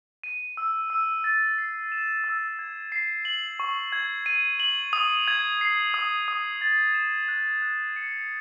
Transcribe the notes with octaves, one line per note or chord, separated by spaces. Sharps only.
D#7
E6
E6
A6
C7
E7
E6
G#6
C7
F#7
C#6
G#6
D#7
F#7
D#6
G#6
C7
D#6
D#6
A6
E7
F#6
F#6
C#7